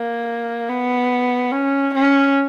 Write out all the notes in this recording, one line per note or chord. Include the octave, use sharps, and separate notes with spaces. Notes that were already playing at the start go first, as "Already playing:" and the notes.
Already playing: A#3
B3
C#4
C#4